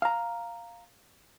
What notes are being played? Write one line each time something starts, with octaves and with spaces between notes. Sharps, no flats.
F5 A#5